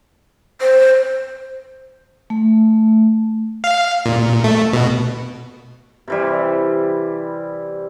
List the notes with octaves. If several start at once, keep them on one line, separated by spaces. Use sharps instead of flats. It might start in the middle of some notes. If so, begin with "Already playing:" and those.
C5
A3
F5
A#2
A3
B2
C3 E3 G3